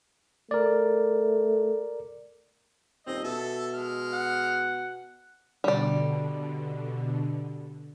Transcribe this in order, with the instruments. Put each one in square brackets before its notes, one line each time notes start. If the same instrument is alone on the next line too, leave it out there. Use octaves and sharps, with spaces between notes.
[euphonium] A3 [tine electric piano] A#4 D5
[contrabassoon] D#1 [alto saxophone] C4 [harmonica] D#5
[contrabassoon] B2 [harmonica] A4 [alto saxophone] E5
[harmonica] G#3 F6
[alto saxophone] F#5
[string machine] B2 D3 [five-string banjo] G3 D5